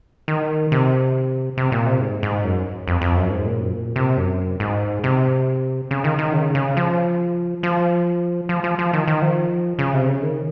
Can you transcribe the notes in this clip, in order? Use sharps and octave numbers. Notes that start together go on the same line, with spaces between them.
D#3
C3
C3
A#2
C3
G#2
G#2
F#2
F2
F2
F#2
G#2
A#2
F#2
A#2
C3
F#2
G#2
C3
C#3
D#3
D#3
C#3
C#3
F3
F3
F3
F3
F3
D#3
D#3
F3
C#3
C3
C#3
D#3